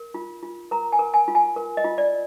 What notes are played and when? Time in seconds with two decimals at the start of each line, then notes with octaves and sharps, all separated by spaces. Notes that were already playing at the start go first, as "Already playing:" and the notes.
Already playing: A#4
0.14 F4
0.43 F4
0.71 A#4 A#5
0.92 G#5
0.99 A#4
1.14 G#5
1.28 F4
1.35 G#5
1.56 A#4
1.77 D#5
1.84 F4
1.98 D5